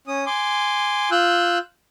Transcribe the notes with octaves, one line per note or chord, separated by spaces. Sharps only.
C#4 D#6
G#5 C6 D6
F4 E6 F#6 G6